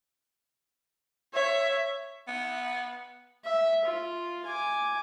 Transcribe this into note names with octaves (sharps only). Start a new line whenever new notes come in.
C#5 E5
B3
E5
F4
G#5 D6